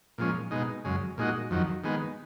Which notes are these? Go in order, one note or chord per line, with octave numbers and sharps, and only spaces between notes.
A#2 F3 G#3 C#4
B2 G#3 D#4
F#2 C#3 G#3
A#2 G#3 D#4 F#4
F2 D#3 F#3
D#3 G#3 B3